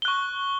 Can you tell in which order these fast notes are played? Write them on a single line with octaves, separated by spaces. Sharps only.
G7 F#6 C#6